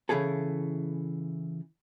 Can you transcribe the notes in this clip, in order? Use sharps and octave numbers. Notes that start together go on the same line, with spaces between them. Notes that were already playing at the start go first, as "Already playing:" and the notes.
C#3 E3 E4 G#4 A4